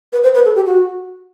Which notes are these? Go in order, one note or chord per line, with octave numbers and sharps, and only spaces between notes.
B4
C5
B4
A4
G4
F#4